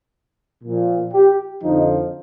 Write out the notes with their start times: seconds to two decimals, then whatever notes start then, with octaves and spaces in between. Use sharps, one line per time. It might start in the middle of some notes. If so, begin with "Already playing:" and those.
0.63 A#2 F3
1.13 G4
1.62 F2 D3 F3 D#4